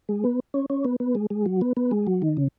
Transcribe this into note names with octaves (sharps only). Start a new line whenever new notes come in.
G#3
B3
C#4
C#4
B3
B3
G#3
G#3
F#3
B3
B3
G#3
F#3
D#3
C#3